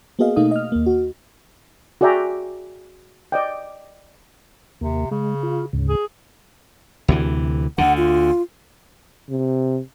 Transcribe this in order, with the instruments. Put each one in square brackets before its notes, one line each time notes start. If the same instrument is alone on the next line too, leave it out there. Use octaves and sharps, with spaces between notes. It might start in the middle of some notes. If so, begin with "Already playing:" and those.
[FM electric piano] A#3 B3 F#4 G#4 D#5 F5
B2 A3 A#3 D#4 F5 D#6
D#5 F6
D#2 A#3
F#4
[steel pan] F#4 G#4 D5 E5 G5 A#5
D5 D#5 G5
[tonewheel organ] D#2 A#3 [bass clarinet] C3
[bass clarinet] C#3 [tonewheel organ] G#3
[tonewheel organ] F4
D2 G#2 C#3
[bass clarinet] G#4
[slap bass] D2 C3 E3
[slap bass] D2 D3 [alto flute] F#5
[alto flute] F4
[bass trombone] C3